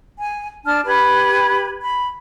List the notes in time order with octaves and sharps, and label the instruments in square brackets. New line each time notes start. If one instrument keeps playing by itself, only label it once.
[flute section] G#5
D4 A5 F6
G4 B4 B5 G#6
B5